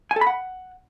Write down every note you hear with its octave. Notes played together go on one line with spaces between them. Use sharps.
G#5
A4
B5
F#5